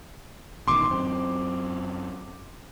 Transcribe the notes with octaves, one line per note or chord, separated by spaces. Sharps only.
A1 B2 D#3 C6 D6
F#2 C4